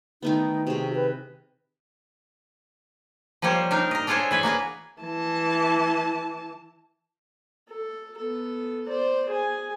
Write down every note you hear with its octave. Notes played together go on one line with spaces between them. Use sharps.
D#3 A3 B3 D#4
C3 F#4 G#4
B4
F3 G3 A#3 C5 C#5
D4 D#4 A#4
A#4 D#5
D4 F4 G#4 A4 C5 C#5
E3 B4 G#5
A#3 F#4 G#4 B4
E3 A5
A4
B3 A4
C5 D5
G#4 G#5